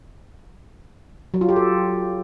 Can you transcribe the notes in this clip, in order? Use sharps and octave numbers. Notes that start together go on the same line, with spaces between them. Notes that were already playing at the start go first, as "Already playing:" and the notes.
F#3
F4
G4
A4